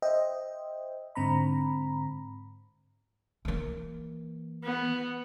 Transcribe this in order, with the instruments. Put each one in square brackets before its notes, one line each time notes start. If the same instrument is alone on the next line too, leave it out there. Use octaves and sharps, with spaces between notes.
[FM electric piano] C5 D#5 E5 G5
G#2 D3 C4 A#5 B5
[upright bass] E3 A#3
[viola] B3